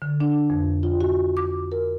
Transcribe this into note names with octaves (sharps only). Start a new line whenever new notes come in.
D3
D4
F2
F4
F#4
D6
A#4